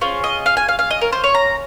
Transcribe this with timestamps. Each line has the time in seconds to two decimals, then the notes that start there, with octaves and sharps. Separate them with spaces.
0.01 C#4 F4 G#4 C5
0.24 D#5
0.46 F5
0.57 G#5
0.68 F5
0.79 F5
0.90 D#5
1.01 A#4
1.12 C5
1.24 C#5
1.35 A#5